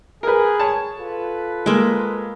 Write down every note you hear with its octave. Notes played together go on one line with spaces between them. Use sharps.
G#4 A#4 B4
C#5 A5
F4 A4 B4
G#3 A#3 E5 D6